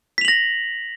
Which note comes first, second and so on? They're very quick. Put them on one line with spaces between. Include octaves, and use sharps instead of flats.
B6 F7 F#7 A#6